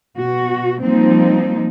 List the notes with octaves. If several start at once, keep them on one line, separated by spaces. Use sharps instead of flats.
B2 F#4
F3 G3 A#3 C4 D#4